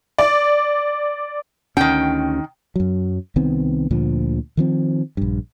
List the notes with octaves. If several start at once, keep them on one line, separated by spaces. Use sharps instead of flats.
D5
D2 D#3 C#4 G5
F#2 F#3
C2 D#3 B3 C4
D2 A#2 D3 F3
D#3 F3 C4
A#1 G2